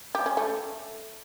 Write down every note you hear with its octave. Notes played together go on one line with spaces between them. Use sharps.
G4
C#4
A3